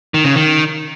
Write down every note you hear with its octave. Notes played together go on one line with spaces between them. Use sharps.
D#3
C#3
D#3